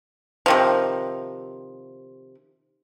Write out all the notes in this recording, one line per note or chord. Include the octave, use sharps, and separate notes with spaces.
C3 D#3 F3